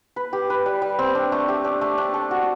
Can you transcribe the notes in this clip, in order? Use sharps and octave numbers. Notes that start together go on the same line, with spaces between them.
B4
G4
B4
G3
G3
C4
D4
A3
G4
D4
A3
D4
A4
F#4